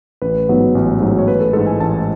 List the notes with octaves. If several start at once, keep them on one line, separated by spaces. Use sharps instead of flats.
A1 B4
G#2 F#3 B3
A1
G#2 F#3 B3
C#5
A1 B4
A4
G#2 E3 G#3 A4
G#5
A1 A5